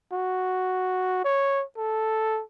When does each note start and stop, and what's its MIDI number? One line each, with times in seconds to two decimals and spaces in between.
0.12 1.20 66
1.25 1.64 73
1.77 2.42 69